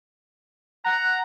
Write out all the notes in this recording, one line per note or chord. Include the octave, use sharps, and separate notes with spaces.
F#5 A#5